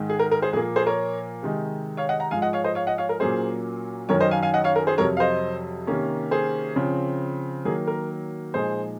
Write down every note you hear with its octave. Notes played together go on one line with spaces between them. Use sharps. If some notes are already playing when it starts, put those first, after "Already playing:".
Already playing: G#2 D#3 G#3
G#4
A#4
A#4
G#4 C5
A#2 F3 A#3 G#4
G#4 C5
A#4 C#5
C3 D#3 G#3 D#4
C#5 F5
D#5 F#5
F#5 A#5
G#2 F3 G#3 F5 G#5
D#5 F#5
C#5 F5
C5 D#5
C#5 F5
D#5 F#5
C#5 F5
A#4
A#2 F#3 A#3 C#4 G#4 C5
F#2 D#3 F#3 C#4 A#4 C#5
C5 D#5
F5 G#5
F5 G#5
D#5 F#5
C#5 F5
A#4
G#4 C5
F2 C3 F#3 A#4 C#5
F5
C5 D#5
C3 D#3 A#3 C#4
G#4 C5
C#3 F3 C4
D#3 F#3 A#3 G#4
A#4
A#2 F3 G#3 D#4 G#4 C5